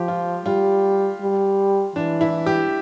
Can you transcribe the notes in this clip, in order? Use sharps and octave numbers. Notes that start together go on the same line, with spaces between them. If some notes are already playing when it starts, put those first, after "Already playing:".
Already playing: F3 G4
F4
G3 F4
G3
E3 D4
E4
G4